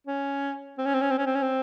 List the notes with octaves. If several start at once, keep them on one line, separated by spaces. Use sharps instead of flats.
C#4
C4
C#4
C4
C#4
C4
C#4
C4
C#4
C4